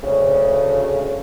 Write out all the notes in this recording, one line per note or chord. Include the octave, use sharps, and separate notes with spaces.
D2 C#3